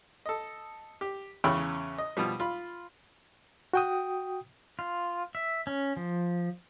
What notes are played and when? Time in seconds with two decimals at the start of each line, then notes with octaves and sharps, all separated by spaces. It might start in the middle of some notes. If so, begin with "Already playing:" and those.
0.26 A4 D#5
1.01 G4
1.44 E2 C#3 C#4 G5 B5 E6
1.98 D#5
2.17 B2 F3 G3
2.40 F4 B5
3.73 F#4 G5 D#6
4.79 F4
5.35 E5
5.67 C#4
5.97 F3